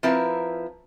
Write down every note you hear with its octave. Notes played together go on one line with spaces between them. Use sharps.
F3 C4 E4 A#4 B4